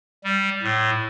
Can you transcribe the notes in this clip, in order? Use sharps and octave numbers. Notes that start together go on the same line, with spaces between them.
G3
A2